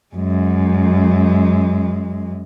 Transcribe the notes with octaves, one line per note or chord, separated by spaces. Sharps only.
F#2 G#3